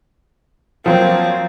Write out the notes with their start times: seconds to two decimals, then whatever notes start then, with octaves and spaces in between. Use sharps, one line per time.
0.86 F3 F#3 A#3 C4